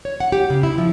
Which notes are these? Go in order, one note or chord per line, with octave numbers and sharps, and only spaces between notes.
C#5
F#5
G4
C#3
E4
F3